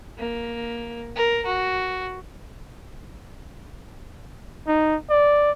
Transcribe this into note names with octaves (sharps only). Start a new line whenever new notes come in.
A#3
A#4
F#4
D#4
D5